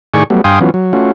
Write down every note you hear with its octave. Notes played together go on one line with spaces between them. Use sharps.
A2 D#3 G#4 D5 G#5 C#6
F#3 G3 A3 B3
G2 F5 G5 G#5 C6 D#6
E3 F#3 B3 C#4 F4
F#3
A3 C#4 F4 F#4